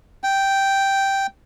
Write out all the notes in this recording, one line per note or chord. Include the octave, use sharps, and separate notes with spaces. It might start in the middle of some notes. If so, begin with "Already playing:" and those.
G5